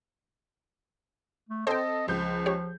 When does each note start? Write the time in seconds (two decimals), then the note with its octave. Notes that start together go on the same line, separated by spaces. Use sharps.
1.49 A3
1.67 C4 A4 C5 D#5 G5
2.08 C#2 F3 G6
2.46 G4 C#5